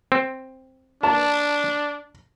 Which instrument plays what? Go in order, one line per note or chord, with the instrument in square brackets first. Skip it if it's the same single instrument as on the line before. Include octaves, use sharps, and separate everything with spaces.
[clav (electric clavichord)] C4
[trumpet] D4 [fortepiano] A5